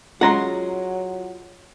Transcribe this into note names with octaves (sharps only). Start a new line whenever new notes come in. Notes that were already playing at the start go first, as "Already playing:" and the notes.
F#3 G#3 C#4 F4 F#5 A#5 C6